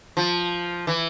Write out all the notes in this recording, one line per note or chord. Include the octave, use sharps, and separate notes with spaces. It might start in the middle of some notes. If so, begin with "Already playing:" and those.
F3
E3